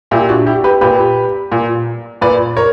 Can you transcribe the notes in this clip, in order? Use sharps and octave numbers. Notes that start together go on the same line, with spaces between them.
A#2 E4 G4
D4 F#4
E4 G4
G4 B4
A#2 G4 B4
A#2
A#2 B4 D5
A#4 C#5